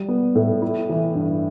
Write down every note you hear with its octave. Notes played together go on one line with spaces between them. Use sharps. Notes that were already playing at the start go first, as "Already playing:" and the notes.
Already playing: G3
B3
A2
E4
E3
G2